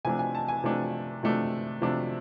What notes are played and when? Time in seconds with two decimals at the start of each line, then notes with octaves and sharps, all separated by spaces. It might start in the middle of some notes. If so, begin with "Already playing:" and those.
0.05 C3 F3 A3 D4 G#5
0.19 G#5
0.35 A5
0.48 G#5
0.64 C3 F3 A3 D4
1.23 C3 F3 A3 D4
1.82 C3 F3 A3 D4